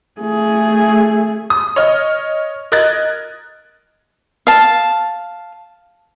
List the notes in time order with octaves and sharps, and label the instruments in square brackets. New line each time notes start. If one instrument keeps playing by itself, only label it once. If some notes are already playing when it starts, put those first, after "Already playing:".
[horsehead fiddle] A3 G#4
[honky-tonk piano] D#6
C#5 D#5 F6
A#4 D#5 F#6 G#6 A6
[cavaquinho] F5 A5